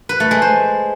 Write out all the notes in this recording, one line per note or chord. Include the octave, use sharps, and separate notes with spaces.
B4
A3
G#3
C5